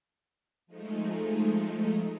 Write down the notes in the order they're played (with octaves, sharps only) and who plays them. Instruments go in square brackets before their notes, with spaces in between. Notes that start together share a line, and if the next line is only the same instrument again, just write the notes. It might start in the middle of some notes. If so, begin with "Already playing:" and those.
[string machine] F3 G#3 A3 D#4